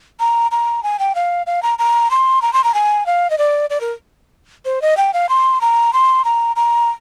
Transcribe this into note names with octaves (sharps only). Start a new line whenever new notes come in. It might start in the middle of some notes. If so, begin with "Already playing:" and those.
A#5
A#5
G#5
G5
F5
F5
A#5
A#5
C6
A#5
C6
A#5
G#5
F5
D#5
D5
D5
A#4
C5
D#5
G5
F5
C6
A#5
C6
A#5
A#5